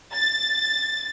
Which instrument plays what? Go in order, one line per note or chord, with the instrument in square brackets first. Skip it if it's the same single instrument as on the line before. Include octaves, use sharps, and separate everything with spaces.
[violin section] A6